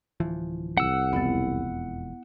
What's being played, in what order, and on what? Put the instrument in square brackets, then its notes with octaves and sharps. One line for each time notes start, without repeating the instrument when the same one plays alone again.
[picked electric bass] D1 E3 F3
[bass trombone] C2 [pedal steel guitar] F#5 E6
[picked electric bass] E1 F2 [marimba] B3 E4 A6